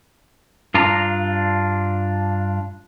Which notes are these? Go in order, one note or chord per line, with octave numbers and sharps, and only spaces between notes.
G2 D4 F4 A#5